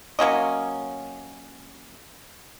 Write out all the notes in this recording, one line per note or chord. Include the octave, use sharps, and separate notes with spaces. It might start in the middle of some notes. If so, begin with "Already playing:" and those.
F#3 A#3 C#4 D#5